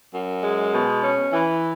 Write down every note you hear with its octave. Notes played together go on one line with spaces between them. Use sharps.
F#2
G#3
B2
C#4
E3